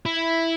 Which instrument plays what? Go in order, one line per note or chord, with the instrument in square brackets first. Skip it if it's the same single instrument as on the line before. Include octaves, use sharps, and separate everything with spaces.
[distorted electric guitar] E4